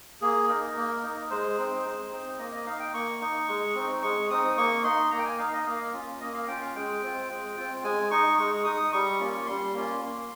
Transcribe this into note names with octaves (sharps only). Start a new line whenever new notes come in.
A#3 G#4
D#4 A#4
A#3
D#4
G#3 C5
C4 D#4
G#3
C4 D#4
A#3 D#5
D#5
D#4 F5
G5
A#3 C#6
D#4
G#3
C4 D#4
G#3 C#6
C4 D#4 D#6
A#3 C#6
D#4 C6
A#3 A#5
G5
G#5
D#4 F5
D#5
A#3 F5
C#4 F4
A#3 D#5
F5
C#4 F4 G5
F5
G#3 G5
C4 F4
G#3
C4 F4
G#3 G#5
D#4 C#6
G#3 C#6
D#4 D#6
G3 C#6
A#3 C#4 F4
G3 C6
A#3 C#4 F4
A#3